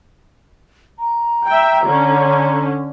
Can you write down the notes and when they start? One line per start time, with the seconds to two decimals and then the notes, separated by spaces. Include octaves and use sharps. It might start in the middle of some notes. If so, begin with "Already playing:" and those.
0.99 A#5
1.48 E5 G5
1.86 D3 C#4